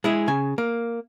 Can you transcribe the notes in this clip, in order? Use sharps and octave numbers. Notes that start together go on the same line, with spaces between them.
G#3 E4 G#4
C#3 G#5
A#3